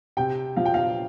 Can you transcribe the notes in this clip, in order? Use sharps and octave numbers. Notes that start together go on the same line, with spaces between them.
C3 G5
F3 F5
G5
F5